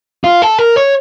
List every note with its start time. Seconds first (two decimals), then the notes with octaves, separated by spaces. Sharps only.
0.24 F4
0.42 A4
0.59 A#4
0.76 C#5